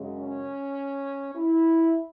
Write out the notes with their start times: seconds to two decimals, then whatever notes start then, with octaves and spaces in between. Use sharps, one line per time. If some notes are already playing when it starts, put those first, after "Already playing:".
Already playing: F#2 C#3 G#3
0.18 C#4
1.35 E4